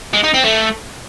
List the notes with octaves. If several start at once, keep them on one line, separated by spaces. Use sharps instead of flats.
G#3
D#4
C4
A3